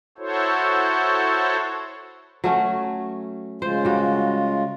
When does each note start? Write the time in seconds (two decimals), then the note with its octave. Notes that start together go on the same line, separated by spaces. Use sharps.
0.18 E4 F#4 A4 C5 C#5
2.44 F#3 A3 C#4
3.62 C#3 G#3 F4 C5
3.85 G3 F#4